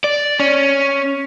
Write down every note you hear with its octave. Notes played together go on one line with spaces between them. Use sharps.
D5
C#4